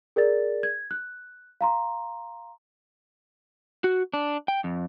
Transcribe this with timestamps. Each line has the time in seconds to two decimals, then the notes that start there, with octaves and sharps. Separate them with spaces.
0.16 G#4 A#4 D5 A6
0.63 G#6
0.91 F#6
1.61 F5 A#5 C6
3.84 F#4
4.14 D4
4.48 G5
4.64 F2